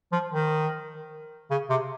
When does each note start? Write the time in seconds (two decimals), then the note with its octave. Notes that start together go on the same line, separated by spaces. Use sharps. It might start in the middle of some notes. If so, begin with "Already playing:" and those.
0.12 F3
0.32 D#3
1.51 C#3
1.70 C3